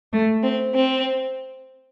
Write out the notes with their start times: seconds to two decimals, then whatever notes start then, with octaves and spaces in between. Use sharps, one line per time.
0.12 A3
0.43 C4
0.74 C4